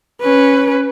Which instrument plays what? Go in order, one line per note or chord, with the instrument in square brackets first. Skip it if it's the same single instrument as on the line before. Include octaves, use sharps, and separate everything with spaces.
[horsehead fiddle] C#4 B4